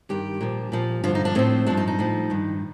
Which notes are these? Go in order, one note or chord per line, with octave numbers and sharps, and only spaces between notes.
G2 D#3 G4
A#2 F3
A#2 F3
G2 D3 F3 F4
D#4
D4
A2 F3 C4
G2 F3 D4
D#4
D#4
A2 F3
G2 D#3